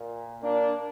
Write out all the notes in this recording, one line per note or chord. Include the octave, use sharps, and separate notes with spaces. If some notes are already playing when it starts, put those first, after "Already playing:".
Already playing: A#2
A#3 D4